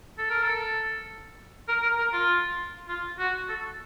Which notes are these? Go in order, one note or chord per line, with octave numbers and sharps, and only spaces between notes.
A4
A#4
A4
A#4
A#4
A#4
F4
F4
F#4
A4